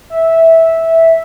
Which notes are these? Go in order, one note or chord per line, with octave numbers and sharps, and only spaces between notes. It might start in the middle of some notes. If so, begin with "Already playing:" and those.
E5